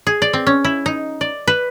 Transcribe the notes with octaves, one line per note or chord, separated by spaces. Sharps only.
G#4
D5
C4
C#4
E4
D#4
D5
B4